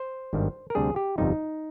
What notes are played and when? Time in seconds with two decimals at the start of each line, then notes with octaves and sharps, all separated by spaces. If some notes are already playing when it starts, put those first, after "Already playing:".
Already playing: C5
0.33 G#1 G2 D#3 G3
0.70 A#4
0.75 D2 C3 G3 D4 G#4
0.96 G4
1.18 G1 F2 C3 G3 D#4